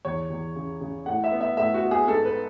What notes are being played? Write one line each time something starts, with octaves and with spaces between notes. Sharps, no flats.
E2 C#5
E2
C#3
C#3
A2 F#5
E5
B3
E5
A2 E5
F#4
B3
G#4
G#2 A4
B4